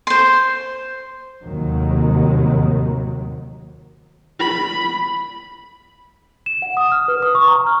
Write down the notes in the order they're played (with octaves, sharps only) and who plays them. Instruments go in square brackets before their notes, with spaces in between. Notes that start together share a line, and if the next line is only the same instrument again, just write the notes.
[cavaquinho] C5 C6
[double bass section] D#2 A2 C3 D#3 F#3
[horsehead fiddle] B5
[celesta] E7
F#5
D#6
F6
B4
D#6
C#6
A#5
F6